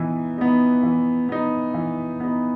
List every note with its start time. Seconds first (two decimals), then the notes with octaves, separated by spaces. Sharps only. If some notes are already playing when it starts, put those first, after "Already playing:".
Already playing: E3 B3 D#4
0.38 B3 D#4
0.83 E3
1.29 B3 D#4
1.74 E3
2.20 B3 D#4